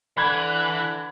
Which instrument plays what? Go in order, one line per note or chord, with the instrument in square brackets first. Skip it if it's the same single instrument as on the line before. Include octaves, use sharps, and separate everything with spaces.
[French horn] D3 [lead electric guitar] E3 [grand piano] B5 G#6 [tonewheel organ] F#6